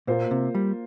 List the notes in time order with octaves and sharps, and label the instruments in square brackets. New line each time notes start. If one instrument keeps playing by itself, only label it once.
[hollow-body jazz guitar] A#2 [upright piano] A#3 F4 C5
[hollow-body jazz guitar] C3
G3